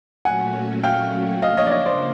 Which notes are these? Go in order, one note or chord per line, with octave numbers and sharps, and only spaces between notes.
A#2 F#3 A3 C#4 F#4 F#5 G#5
F5 G5
C#3 F3 A#3 D4 D#5 F5
C#5 D#5
D5
C#5 D#5
C5 D5